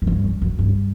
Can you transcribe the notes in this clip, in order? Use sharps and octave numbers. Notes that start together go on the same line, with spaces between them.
F#2
G2
F#2
F#2
G2